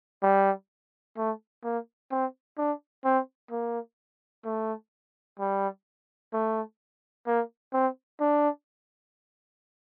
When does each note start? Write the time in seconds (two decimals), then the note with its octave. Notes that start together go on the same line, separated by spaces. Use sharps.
0.23 G3
1.17 A3
1.64 A#3
2.11 C4
2.58 D4
3.04 C4
3.51 A#3
4.45 A3
5.39 G3
6.33 A3
7.27 A#3
7.73 C4
8.21 D4